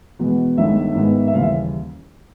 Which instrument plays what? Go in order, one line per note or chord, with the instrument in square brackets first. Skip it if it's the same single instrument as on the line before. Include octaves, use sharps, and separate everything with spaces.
[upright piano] E2 B2 G#3 B3
G1 G2 D#3 G#3 E5
G#2 D#3 G#3 B3
E5
D#2 C#3 E3 G3 F5
E5